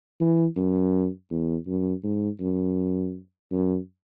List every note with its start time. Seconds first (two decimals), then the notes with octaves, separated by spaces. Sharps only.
0.20 E3
0.56 F#2
1.30 E2
1.67 F#2
2.03 G#2
2.40 F#2
3.51 F#2